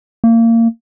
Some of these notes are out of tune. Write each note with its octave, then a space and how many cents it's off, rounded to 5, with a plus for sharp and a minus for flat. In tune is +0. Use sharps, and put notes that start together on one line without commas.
A#3 -25